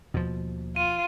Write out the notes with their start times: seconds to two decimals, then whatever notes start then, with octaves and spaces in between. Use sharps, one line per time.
0.14 D#2 B2 F3
0.76 F4 D#7